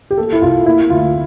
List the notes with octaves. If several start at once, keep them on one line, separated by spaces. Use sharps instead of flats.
G4
A#3 A4
E4
C2 F4
A#3 E4
D2 F4